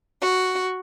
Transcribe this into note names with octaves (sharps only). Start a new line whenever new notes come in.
F#4